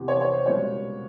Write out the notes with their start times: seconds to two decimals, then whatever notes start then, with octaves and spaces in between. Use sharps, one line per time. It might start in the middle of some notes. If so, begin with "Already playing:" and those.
Already playing: E2 C3 E3
0.08 C#5
0.21 C#5
0.33 C5
0.46 C#2 B2 G3 A#3 C#5